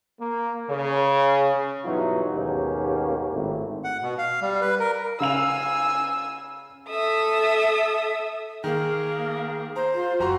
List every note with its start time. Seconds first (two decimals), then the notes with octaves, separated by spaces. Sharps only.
0.20 A#3
0.71 C#3
1.83 G2 B2 E3 F#3 D#4 F4
2.33 D#2 G#2 B2 A#3 C#4 G4
3.31 G#1 A2
3.84 F#5
4.02 B2
4.18 F5
4.42 G3
4.61 B4
4.80 A#4
5.20 C#3 F5 G#5 E6 F7
6.90 A4 E5 D#6
8.64 D#3 A#3 G#4
9.76 C5 A#5
9.93 F4
10.19 F#1 F#4 A#5 C6